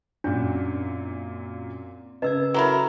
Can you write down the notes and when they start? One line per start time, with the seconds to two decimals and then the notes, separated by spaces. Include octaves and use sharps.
0.24 F#2 A#2 C4 D4 D5
2.22 C#3 A#4 B4 D#5 E6 G#6
2.54 F#3 E4 A4 A#4 A#5 C#6